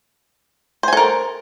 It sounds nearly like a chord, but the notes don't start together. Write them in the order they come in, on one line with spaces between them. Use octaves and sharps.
C5 G#5 A4 A#4